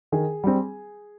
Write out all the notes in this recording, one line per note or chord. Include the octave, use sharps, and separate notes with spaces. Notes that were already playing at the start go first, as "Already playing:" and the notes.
D#3 G#4
G3 C4